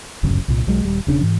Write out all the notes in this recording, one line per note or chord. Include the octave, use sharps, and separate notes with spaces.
D1 G1 F#2 C#3
C2 A#2
B1 F#3 G#3
D#1 G3
E1 C#3 D4
G#2 E3